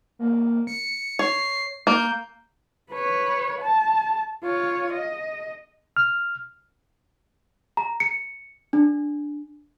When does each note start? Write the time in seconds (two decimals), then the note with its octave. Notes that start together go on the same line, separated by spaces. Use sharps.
0.19 A#3
0.67 C#7
1.19 C#5 C7
1.87 A#3 G6
2.92 B4 C#5
3.61 A5
4.43 F4 C#5
4.93 D#5
5.97 F6
7.77 A#5
8.00 C#7
8.73 D4